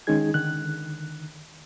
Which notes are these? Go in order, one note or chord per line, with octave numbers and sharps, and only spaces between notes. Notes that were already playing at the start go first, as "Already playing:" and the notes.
D#3 G#3 C#4 D#4 G#4 G#6
D3 D#3 F#6